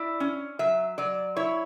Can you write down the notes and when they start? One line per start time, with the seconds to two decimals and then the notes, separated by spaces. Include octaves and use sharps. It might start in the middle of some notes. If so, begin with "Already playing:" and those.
Already playing: E4 D5
0.20 C#4
0.59 F#3 E5
0.98 F#3 D5
1.36 E4 C#5